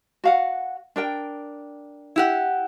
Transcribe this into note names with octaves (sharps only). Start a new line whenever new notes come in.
F#4 F5 F#5
D4 A#4 G5
E4 G4 F#5